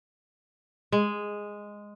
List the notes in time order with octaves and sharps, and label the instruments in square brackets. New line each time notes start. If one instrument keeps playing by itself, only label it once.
[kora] G#3